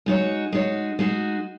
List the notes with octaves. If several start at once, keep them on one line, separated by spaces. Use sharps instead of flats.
G#3 D#4 F#4 C#5
G#3 D#4 F#4 C#5
G#3 D#4 F#4